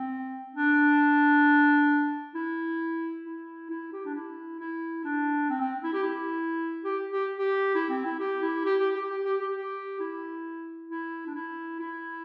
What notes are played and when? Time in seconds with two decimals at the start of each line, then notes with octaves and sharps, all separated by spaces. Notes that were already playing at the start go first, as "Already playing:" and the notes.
Already playing: C4
0.55 D4
2.34 E4
3.25 E4
3.70 E4
3.92 G4
4.05 D4
4.15 E4
4.60 E4
5.05 D4
5.49 C4
5.61 C4
5.83 E4
5.93 G4
6.03 E4
6.84 G4
7.12 G4
7.38 G4
7.75 E4
7.89 C4
8.05 E4
8.19 G4
8.42 E4
8.65 G4
8.80 G4
8.94 G4
9.10 G4
9.25 G4
9.40 G4
9.54 G4
10.00 E4
10.90 E4
11.27 D4
11.35 E4
11.80 E4